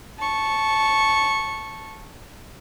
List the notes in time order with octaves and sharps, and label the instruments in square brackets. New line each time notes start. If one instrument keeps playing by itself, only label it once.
[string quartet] A5 C#6